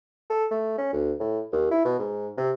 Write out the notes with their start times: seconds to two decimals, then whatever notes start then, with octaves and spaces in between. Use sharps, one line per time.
0.30 A4
0.51 A3
0.78 C#4
0.93 D2
1.20 A2
1.52 D#2
1.71 E4
1.85 B2
1.99 G#2
2.37 C3